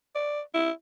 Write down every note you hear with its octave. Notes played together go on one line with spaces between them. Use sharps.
D5
E4